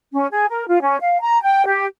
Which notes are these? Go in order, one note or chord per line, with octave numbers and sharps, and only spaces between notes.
C#4
G#4
A#4
F4
C#4
F5
A#5
G5
G4